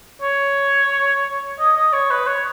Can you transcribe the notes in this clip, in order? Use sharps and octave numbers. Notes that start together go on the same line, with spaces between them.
C#5
D#5
D#5
C#5
B4
C#5